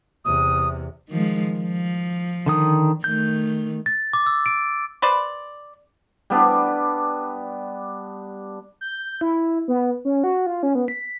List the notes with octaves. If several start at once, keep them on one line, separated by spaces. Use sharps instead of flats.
E2 C3 D#6
D#3 F3 G#3
F3
D3 D#3 D#6
D#3 A3 G6
A6
D6
E6
D7
B4 C5 D5
G3 B3 D4
G6
E4
B3
C#4
F#4
F4
C#4
B3
B6